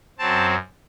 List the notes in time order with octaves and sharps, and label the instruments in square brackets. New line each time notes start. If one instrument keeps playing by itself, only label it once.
[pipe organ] F#2 F#3 C4 A5